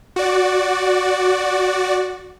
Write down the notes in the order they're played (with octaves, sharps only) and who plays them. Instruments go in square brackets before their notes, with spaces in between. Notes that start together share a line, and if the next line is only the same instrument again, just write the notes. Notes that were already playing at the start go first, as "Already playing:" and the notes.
[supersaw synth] F#4 D5